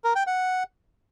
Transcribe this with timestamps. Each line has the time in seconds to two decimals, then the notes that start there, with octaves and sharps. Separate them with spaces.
0.04 A#4
0.16 G5
0.27 F#5